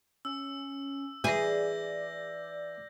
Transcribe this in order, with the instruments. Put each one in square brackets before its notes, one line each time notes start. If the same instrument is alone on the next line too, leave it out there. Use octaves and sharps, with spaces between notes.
[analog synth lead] C#4 [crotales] E6
[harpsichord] E3 [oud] G#4 [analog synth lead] D5 [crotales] G6 A#6